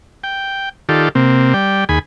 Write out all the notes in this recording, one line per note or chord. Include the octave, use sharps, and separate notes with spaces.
G5
D#3 F4 G4 A4 D5
C3 A#3 C4
G3 D5 G5
D#2 G#4 G#5 B5